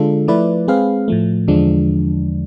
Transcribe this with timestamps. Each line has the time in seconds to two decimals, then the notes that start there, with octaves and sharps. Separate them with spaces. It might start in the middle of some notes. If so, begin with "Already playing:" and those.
Already playing: D3 G#3 D4 F4 A4
0.28 F3 A3 E4 B4 D5
0.68 G#3 C4 G#4 B4 F5
1.08 A2 F3 A3
1.48 E2 D3 F3 G#3 D4